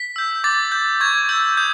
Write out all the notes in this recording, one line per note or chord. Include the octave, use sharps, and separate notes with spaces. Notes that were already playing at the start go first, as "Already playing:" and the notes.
Already playing: B6
E6 G6
D6 A6
G6
C#6 G#6
E6 G6
D#6 G6